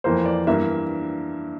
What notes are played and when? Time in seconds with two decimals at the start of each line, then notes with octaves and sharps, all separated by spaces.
0.04 F2 E3 A#3 C5
0.26 D5
0.47 G2 E3 A#3 E5